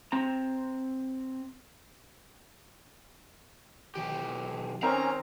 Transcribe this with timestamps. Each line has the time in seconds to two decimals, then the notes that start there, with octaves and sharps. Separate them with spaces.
0.12 C4 A#5
3.95 B1 D#3 G4
4.83 C4 C#4 D#4 A#4 A#5